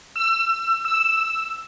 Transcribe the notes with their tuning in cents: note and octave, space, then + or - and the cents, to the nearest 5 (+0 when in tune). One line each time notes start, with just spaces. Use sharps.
E6 +25
E6 +0